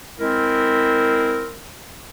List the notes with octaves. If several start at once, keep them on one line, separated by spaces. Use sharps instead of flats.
G#3 C4 E4 A#4